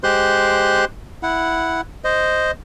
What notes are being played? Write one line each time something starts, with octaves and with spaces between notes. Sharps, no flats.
G#3 G4 C5 C6 F#6
E4 F#5
C5 D#5